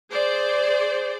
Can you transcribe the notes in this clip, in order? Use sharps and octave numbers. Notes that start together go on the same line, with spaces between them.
G#4 C5 D5